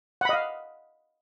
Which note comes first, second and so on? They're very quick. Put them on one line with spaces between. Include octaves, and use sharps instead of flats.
F#5 B5 D#5 F5